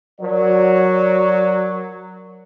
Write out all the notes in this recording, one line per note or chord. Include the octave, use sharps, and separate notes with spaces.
F#3 A#4 D5